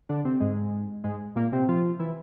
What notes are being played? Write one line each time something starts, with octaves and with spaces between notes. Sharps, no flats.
D3 D4
C3 C4
G#2 G#3
G#2 G#3
A#2 A#3
C3 C4
F3 F4
E3 E4